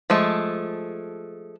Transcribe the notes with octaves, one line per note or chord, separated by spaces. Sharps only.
F3 G#3 A3